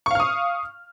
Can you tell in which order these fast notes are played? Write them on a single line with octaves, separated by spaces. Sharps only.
C#6 F5 F6 D#6